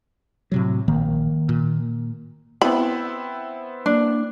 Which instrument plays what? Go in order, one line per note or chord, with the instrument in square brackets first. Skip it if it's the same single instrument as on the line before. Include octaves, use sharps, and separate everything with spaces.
[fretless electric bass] A2 C3 F#3
[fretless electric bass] A#1 [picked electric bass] D#3 A#3
[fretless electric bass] A#2
[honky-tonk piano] B3 C4 E4 [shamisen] B5
[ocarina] A#3 [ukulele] D4